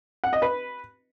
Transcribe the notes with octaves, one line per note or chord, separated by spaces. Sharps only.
F#5
D#5
B4